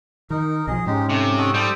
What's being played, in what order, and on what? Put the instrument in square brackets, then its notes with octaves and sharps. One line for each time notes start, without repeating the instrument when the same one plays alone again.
[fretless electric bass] D#3 [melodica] D#4 A#4
[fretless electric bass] B1 F3 [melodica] G#4 D#5
[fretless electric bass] G#2 [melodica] G#3 D#4 G4 [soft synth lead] C#4
[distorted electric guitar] C3 [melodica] A3
[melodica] F#4 A4 D#5
[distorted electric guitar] G3 [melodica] A4 C5 D#6